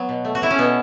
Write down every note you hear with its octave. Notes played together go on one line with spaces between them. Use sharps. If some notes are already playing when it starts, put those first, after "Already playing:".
Already playing: F#3 B3
B2
A3
F#4
F#3 E4
C#4
B2 B3